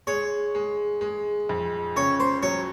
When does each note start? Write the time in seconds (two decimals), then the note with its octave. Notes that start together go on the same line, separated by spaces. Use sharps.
0.07 G#3 C#5
0.55 G#3
1.01 G#3
1.49 F2
1.96 C#3 C#5
2.20 C5
2.43 F#3 C#5